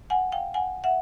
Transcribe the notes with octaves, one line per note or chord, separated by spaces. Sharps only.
F#5 G#5
F5 G5
F#5 G#5
E5 F#5